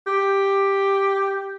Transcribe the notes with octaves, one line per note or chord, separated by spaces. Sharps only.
G4